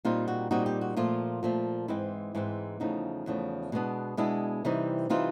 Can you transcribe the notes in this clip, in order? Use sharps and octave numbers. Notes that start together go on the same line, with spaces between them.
A#2 G3 C4 D#4 F4
F#4
A#2 G3 C4 D#4 F#4
G4
F#4
A#2 F3 A3 F4
A#2 F3 A3
G#2 E3 G#3 C4 E4
G#2 E3 G#3 C4
E2 C#3 F3 A3 D#4
E2 C#3 F3 A3
B2 G#3 B3 D4
B2 G#3 B3 D4 E4
C3 E3 G3 C4 D#4
C3 E3 G3 C4 D#4 F4